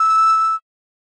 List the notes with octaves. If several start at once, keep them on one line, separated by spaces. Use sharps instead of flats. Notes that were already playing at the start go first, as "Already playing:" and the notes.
Already playing: E6